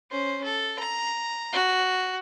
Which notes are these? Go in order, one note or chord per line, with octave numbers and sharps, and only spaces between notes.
C#4 C5
A4
A#5
F#4